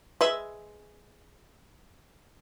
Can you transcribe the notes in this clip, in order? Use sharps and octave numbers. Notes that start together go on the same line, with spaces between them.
G#3 B4 E5